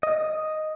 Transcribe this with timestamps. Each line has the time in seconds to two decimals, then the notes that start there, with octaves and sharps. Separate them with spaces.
0.03 D#5